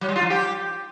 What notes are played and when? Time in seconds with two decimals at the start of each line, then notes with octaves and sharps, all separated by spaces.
0.01 F#3
0.08 G3
0.16 F4
0.23 F3
0.30 G4